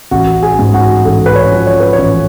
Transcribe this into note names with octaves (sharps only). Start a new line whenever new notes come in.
A1 F#4
G#4
G#2
F#4
A1 A4
B4
C#5
F3
C#5
B4
C#5
A1